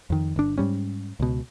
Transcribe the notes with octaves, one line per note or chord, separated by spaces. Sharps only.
F2 D#3
G1 D4
G#2 G3 C#4
C#2 B2